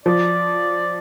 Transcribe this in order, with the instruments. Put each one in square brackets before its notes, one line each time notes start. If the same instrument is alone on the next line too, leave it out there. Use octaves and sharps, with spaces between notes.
[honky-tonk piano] F3 [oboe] D5